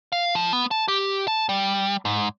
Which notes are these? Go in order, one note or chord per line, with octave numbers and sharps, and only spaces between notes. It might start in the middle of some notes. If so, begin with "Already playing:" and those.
F5
F3
B3
A5
G4
A5
G3
G#2